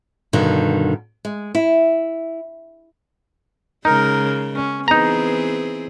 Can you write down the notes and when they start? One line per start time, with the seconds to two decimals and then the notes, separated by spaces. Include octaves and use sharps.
0.33 G2 B2 D3 D#3
1.25 G#3
1.55 E4
3.85 C#3 G#3 D#4 A#4
4.56 C#4
4.88 E3 B3 C4 D#4 G#4 A#5